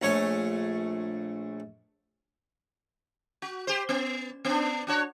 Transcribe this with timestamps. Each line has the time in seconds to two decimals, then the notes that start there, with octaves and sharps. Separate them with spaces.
0.02 A#1 A3 C#5 G#5
3.42 F#4
3.67 G4 C5
3.89 B3
4.45 B3 D4
4.87 D4 F#4 C#5